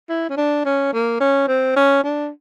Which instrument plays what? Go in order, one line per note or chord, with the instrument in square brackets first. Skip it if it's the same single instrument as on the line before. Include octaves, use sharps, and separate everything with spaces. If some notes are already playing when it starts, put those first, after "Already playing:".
[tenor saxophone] E4
C#4
D4
C#4
A#3
C#4
C4
C#4
D4